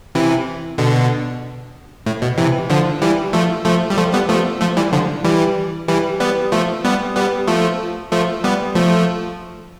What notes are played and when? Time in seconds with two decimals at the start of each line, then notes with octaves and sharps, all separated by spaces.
0.15 C3 E3
0.78 B2 D3
2.06 A2
2.22 B2
2.38 C3 E3
2.70 D3 F3
3.02 E3 G3
3.33 F3 A3
3.65 F3 A3
3.90 G3
3.98 F3 A3
4.13 G3 B3
4.29 F3 A3
4.61 F3 A3
4.77 E3 G3
4.93 D3 F3
5.24 E3 G3
5.88 E3 G3
6.20 G3 B3
6.52 F3 A3
6.84 G3 B3
7.16 G3 B3
7.47 F3 A3
8.12 F3 A3
8.44 G3 B3
8.75 F3 A3